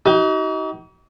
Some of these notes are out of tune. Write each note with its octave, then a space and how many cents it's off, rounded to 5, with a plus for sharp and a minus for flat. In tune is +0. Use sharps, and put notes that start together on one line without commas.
D#4 +30 F#4 +45